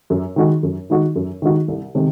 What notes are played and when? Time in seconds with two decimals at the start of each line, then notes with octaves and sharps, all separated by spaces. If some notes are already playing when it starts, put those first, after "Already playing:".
0.10 F#2
0.36 D#3 G#3 D#4 F#4
0.63 F#2
0.90 D#3 G#3 D#4 F#4
1.16 F#2
1.42 D#3 G#3 D#4 F#4
1.68 C2
1.95 C3 D#3 G#3